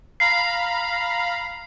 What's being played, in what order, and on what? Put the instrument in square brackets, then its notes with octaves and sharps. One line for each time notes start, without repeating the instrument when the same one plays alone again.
[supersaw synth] F5 A#5 B5 [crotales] C7